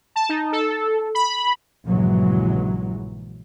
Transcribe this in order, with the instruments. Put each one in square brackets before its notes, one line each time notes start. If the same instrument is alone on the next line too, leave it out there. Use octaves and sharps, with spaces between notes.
[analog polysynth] A5
D#4
A4
B5
[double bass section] A#1 G2 C#3 E3 F#3 G#3